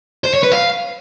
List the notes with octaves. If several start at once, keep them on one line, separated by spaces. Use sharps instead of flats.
C5
C#5
B4
F5